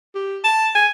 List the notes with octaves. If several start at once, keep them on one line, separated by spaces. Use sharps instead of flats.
G4
A5
G#5